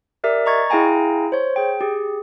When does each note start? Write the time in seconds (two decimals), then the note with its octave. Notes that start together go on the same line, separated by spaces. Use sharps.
0.24 G4 A#4 D5 E5
0.46 D#5 A#5 C#6 G#6 A6
0.70 E4 G#4 F5 G5 G#5 A#5
1.32 C5 C#5
1.56 G#4 G5
1.81 G4 G#4